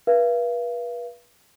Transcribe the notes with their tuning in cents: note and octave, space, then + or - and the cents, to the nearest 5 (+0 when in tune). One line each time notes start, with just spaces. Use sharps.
B4 -35 F5 -40